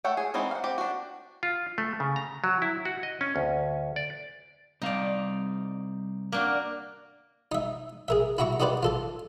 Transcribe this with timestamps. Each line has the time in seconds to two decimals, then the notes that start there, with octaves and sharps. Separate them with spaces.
0.04 A3 A4 C#5 F#5 G5
0.17 G#4
0.34 E3 G#3 C4 D#4 F#4
0.51 F5 F#5
0.64 C4 G4
0.78 D4 F#4
1.43 F4
1.78 A3
2.00 C#3
2.16 A#5
2.44 F#3
2.62 E4
2.85 F#4
3.03 D#5
3.21 C#4
3.36 D2
3.96 D5
4.82 C3 G3 D#4 D5 F5
6.32 A#3 D4 F#4
7.52 D#4 E5
8.08 G#4 A#4 E5
8.38 E4 F#4 E5 A#5 C#6
8.60 D#4 F#4 G4 B4 C5 D5
8.83 F4 A4 A5